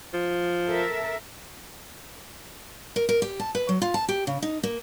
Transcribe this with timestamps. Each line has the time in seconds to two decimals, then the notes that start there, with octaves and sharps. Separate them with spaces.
0.14 F3
0.68 A4 A#4 E5
2.96 A#4
3.09 A#4
3.22 G4
3.40 A5
3.55 B4
3.69 F#3
3.82 F4
3.94 A5
4.09 G4
4.27 C#3
4.42 D#4
4.63 A#3